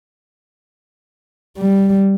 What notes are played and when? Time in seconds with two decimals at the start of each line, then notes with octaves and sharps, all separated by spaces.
1.58 G3